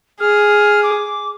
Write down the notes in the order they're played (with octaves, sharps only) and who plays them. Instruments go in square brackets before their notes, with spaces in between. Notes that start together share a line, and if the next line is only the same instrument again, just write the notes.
[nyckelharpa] G#4 [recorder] F6
[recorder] D6